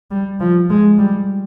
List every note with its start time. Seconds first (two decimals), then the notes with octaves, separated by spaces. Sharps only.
0.11 G3
0.40 F3
0.70 G#3
0.99 G3